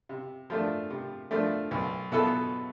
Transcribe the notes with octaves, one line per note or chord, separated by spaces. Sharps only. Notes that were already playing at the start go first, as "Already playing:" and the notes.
C3
F3 A3 D4
C3
F3 A3 D4
B1
B2 B3 E4 A4